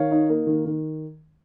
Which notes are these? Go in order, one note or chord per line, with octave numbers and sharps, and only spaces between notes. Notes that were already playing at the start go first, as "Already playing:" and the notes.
Already playing: D#3 C#5 F5
D#4
A#3
D#3
D#3